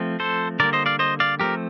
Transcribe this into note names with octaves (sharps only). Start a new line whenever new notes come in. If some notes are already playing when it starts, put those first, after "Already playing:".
Already playing: F3 A3 C4
A4 C5
D3 G3 A#3 A#4 D5
C5 D#5
D5 F5
C5 D#5
D5 F5
F3 A3 C4 G4 A#4